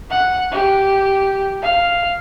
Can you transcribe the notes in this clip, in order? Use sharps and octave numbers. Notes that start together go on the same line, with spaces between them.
F#5
G4
F5